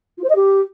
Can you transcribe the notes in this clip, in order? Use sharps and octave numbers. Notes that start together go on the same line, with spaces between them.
F4
C5
D#5
G4